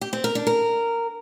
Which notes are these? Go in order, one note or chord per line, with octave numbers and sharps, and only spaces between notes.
G4
C4
A#4
D4
A#4